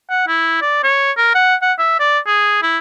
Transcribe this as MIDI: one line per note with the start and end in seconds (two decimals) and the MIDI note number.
0.10 0.25 78
0.27 0.58 64
0.62 0.82 74
0.84 1.12 73
1.17 1.31 70
1.35 1.55 78
1.62 1.73 78
1.79 1.98 76
1.99 2.19 74
2.26 2.58 68
2.63 2.78 64